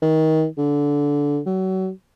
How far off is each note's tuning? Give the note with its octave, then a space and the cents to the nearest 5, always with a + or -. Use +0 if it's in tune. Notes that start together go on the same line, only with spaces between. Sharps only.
D#3 +25
D3 -20
F#3 +30